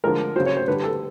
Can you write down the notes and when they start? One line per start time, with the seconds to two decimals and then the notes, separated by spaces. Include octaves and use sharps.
0.04 D3 F3 G#3 A#4
0.36 C#3 F#3 C5
0.46 C#5
0.57 C5
0.68 D3 B4
0.71 G3
0.84 A4